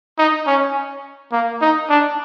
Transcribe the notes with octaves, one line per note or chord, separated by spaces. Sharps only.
D#4
C#4
A#3
D#4
D4